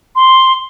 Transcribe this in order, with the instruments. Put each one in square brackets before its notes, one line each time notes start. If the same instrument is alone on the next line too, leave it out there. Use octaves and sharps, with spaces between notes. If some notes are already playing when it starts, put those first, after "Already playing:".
[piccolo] C6